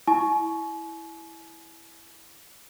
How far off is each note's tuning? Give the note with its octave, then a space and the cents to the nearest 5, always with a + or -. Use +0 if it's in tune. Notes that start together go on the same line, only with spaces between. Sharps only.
E4 +0 G#5 +40 C#6 +0